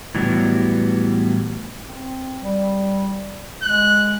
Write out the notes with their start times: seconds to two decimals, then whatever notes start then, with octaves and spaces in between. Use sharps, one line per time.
0.15 A2 E3 F#3 G3 B3
1.84 C4
2.40 G3
3.62 G#3 F#6